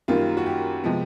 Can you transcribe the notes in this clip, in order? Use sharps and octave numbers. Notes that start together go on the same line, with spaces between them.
F#2 D#3 G3 A#3 F4
F#4
G4
C3 F3 G#3 B3